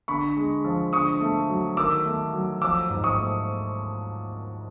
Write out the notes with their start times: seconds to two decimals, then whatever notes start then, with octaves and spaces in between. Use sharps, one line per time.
0.08 D3 B5 C#6
0.37 G#3
0.65 F3
0.93 D3 C#6 D#6
1.21 A3
1.49 F#3
1.77 D#3 D6 E6
2.05 A3
2.33 F#3
2.62 F3 D6 E6
2.90 G#2
3.04 C#6 D#6
3.18 A3